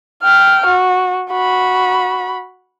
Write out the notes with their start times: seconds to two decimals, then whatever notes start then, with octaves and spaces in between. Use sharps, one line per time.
0.23 G5 F6
0.66 F#4
1.30 F#4 B5